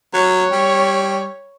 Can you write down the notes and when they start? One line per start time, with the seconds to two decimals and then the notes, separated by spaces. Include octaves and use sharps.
0.14 F#3 C#5
0.52 G3